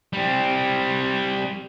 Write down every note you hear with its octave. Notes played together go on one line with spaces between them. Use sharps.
G3 C4